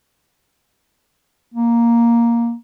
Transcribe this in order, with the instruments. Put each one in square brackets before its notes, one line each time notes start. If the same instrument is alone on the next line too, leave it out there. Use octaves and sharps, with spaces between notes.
[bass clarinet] A#3